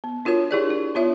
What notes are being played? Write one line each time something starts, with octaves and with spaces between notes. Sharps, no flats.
B3
D4 F4 F#4 A#4 C#5
D4 E4 G4 G#4 C#5 D5
E4
B3 D4 F4 C#5 E5